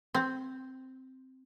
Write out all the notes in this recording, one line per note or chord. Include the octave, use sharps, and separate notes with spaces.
C4